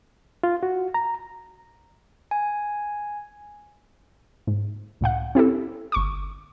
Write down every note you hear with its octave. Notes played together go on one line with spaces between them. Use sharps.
F4
F#4
A#5
G#5
G#2
C#2 A2 F5 F#5
C4 E4 G4 A4
G1 C#6 D6